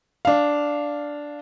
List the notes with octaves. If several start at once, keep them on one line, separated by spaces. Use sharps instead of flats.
D4 F5